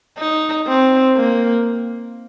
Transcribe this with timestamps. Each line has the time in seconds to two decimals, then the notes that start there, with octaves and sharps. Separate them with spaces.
0.18 D#4
0.67 C4
1.16 A#3